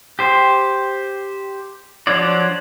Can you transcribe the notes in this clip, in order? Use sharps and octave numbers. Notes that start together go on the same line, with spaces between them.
G4 C5
F3 F#3 D4 C#5 D5